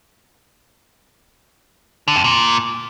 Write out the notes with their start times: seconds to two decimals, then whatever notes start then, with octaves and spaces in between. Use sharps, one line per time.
2.08 D3
2.16 F2
2.24 A#2